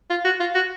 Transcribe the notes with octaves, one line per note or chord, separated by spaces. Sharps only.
F4
F#4
F4
F#4